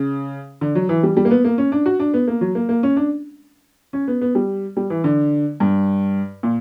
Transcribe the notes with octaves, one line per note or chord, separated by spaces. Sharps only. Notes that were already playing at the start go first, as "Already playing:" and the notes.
Already playing: C#3
D3
F#3
E3
G3
G3
A#3
B3
A#3
C#4
D4
F#4
D4
B3
A#3
F#3
A#3
A#3
C#4
D4
C#4
B3
B3
G3
G3
E3
D3
G2
A#2